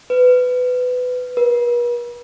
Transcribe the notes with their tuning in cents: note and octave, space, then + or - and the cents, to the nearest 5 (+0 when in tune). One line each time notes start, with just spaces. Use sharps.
B4 +20
B4 -45